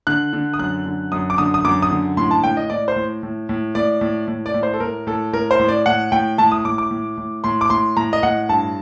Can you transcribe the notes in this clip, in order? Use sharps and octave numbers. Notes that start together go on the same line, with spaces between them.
D3 F#6
D3
D#6
F#2 F#6
D3
F#2 D#6
D6
D3 D#6
D#6
F#2 D6
D#6
D3
A2 C6
A5
A2 G5
D#5
A2 D5
C5
A2
A2
A2
A2 D5
A2
A2
D5
A2
C5
A4
A2 A#4
A2 A4
A2 A#4
C5
A2
D5
A2 F#5
A2 G5
A2 A5
D#6
A2 D6
D6
A2
A2
A2 C6
D6
A2 C6
A2 A#5
D#5
A2 F#5
G2 A5